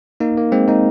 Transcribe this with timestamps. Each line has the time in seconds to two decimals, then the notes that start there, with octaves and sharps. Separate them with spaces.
0.20 A#3 D#4
0.37 A#3
0.52 G#3 C4
0.68 A#3 D#4